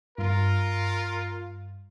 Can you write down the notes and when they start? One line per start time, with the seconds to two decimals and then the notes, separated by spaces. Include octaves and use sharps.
0.18 G2 F4 A#4